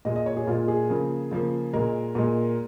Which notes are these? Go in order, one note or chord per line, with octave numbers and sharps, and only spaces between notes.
A#2 G#3 D#5
D#5
C#5
G#4
A#2 G#3 F4
G#4
C#3 F3 A#3
C#3 F3 A#3
A#2 G#3 A#4
A#2 G#3